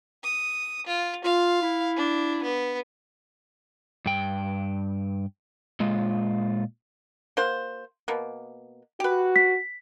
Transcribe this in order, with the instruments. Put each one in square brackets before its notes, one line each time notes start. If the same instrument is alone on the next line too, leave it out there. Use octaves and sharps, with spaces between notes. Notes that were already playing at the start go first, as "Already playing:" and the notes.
[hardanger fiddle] D#6
F4
[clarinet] F4 [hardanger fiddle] F5
[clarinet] E4
[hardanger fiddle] D4
B3
[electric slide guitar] G2 G5
A#2 G#3 F4
[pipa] A#3 F#4 C5
B2 A#3
[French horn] F#4 [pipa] G4 B4
[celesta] B6